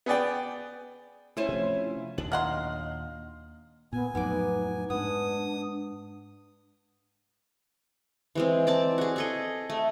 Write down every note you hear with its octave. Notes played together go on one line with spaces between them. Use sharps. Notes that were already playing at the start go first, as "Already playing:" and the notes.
B3 G#4 D5 G5
A3 C#4 E4 C5
C3 F3
D#2 A#2 D4 F#7
F#3 D#5 F5 F#5 C6 F6
A#2 B3 G#5
F2 A2 F#3 B3 D#4 D6
G#2 B3 D4 D#6
E3 G#3 C4
C4 D5 A5
F#4 G#4
G#4 A4 D#5
A3